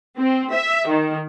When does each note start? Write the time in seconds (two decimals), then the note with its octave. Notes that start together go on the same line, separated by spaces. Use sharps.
0.17 C4
0.52 E5
0.88 D#3